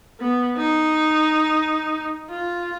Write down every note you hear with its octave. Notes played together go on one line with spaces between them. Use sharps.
B3
D#4
F4